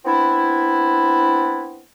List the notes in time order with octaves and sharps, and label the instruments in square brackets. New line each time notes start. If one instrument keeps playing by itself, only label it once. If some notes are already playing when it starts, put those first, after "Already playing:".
[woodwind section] B3 C4 D4 E4